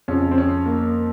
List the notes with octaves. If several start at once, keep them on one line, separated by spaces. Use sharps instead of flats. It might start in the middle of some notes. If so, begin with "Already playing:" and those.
F2 C#3 F3 C#4
C4
C#4
A#3